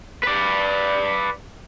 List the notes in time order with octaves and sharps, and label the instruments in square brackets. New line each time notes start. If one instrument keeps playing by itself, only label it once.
[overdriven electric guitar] B4 D5